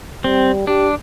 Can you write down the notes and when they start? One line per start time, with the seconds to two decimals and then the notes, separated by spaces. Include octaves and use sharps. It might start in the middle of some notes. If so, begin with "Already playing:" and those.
0.24 G3 C4
0.67 D4 G4